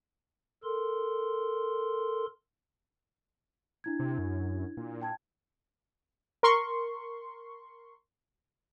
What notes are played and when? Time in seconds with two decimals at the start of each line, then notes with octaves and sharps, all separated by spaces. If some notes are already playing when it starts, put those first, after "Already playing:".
0.64 A4 A#4 C6
3.84 D4 E4 G#6
4.00 C3
4.18 F#2
4.77 A#2
5.02 G5 A5 G#6
6.43 A#4 C6 C#6